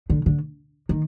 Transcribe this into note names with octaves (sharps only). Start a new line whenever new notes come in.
D3
D3
D#3